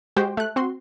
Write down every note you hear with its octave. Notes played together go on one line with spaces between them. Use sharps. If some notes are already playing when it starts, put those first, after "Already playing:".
G#3 F#4 G4 C5 G5
A3 F#6
C4 F#4 C6